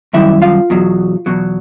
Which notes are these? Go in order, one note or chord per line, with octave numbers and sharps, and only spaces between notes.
F#2 D#3 G3 E4 E5
F4 F5
E2 B2 F#3
E2 B2 F#3